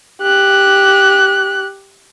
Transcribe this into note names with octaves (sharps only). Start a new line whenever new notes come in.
G4 F#6